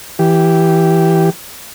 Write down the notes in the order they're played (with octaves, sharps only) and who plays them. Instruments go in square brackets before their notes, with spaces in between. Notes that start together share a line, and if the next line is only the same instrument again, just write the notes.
[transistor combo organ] E3 G4